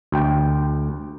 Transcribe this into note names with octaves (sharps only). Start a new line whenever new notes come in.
D2 G5